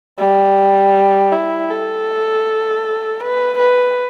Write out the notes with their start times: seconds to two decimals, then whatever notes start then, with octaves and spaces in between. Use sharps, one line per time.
0.19 G3
1.33 E4
1.70 A4
3.21 B4
3.59 B4